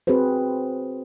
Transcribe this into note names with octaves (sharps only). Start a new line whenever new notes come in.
C4 F#4 G#4 B4 C5